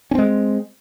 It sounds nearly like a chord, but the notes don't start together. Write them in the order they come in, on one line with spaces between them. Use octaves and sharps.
C#4 C4 G#3